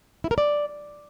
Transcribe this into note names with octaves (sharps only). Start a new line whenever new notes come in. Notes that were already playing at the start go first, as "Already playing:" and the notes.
E4
A#4
D5